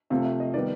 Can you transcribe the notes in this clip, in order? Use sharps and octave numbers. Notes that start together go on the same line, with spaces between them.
C3 F3 A3 F5
E5
D#5
D#3 G3 B3 D5